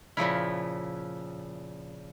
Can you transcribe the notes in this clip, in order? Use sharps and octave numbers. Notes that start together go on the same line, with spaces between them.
A#2 C#3 F3 E4